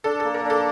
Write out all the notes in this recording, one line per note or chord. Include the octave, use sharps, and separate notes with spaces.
D4 A4
A#3 A4
A#4
D4
A4